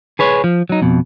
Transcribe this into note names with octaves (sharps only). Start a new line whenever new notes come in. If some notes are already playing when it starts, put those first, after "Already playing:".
G#4 B4 C#5
F3
F#3 D#4
F2 B2